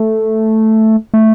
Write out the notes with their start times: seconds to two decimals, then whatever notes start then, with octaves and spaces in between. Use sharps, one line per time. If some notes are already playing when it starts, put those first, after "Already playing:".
Already playing: A3
1.14 A3